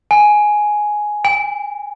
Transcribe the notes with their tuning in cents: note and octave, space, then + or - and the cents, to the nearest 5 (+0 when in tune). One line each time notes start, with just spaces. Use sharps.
G#5 +5
G#5 -45